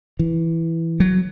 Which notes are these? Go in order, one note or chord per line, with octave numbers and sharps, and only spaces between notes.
E3
F#3